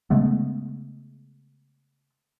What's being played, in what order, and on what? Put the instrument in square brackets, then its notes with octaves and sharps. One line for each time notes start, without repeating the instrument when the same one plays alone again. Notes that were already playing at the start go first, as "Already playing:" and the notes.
[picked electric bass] C#3 G#3 A3 B3